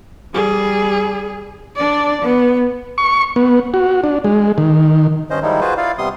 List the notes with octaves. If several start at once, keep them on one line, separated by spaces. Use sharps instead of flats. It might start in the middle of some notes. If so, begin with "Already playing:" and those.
G3 G#4
D4 D5
B3
C#6
B3
F#4
D4
G#3
D#3
G2 C#4 C5 D#5
D#3 F3 G3 G#3 D#4 E4
F4 F#4 G#4 B4 C5
E4 F4 D5 F5
C3 G3 B3 C6 D#6